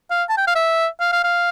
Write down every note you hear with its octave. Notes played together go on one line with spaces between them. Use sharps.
F5
A5
G5
F5
E5
F5
F5
F5